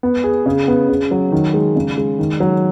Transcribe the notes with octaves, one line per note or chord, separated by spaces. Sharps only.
B3
G#4
C#3
B3
C#3
F#3
D#3
G#3
C#3
G#3
D#3
F#3